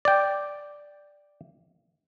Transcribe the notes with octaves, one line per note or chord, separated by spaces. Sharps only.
D5 G5